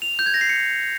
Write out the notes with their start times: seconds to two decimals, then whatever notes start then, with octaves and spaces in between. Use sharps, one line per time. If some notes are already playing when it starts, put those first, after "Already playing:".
0.02 F7
0.19 G6
0.26 G#6
0.34 A#6
0.41 C7
0.49 C#7